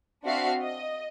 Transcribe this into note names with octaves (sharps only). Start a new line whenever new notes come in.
C4 D4 F#4 E5 F5 C7
D#5